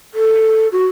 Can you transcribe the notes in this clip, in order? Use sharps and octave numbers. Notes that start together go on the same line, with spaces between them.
A4
F#4